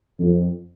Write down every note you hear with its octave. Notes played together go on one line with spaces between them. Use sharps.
F2